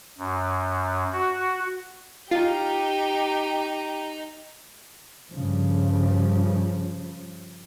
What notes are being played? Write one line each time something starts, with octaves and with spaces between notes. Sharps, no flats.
F#2
F#4
D#4 F4 G4 A#5
G2 C#3 F3